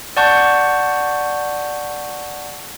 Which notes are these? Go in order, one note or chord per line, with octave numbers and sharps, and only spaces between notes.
D5 F#5 A5 C#6 G6